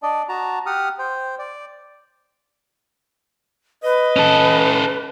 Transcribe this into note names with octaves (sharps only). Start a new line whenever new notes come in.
D4 D5 D#5
F#4 A5 A#5
G4 F#5 D#6 F6
C5 G5
D5
B4 D#5
C#4 A4